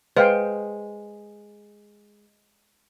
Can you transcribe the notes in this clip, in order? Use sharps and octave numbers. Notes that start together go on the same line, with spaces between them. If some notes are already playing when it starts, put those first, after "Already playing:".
G#3 B4 C5 F5 G5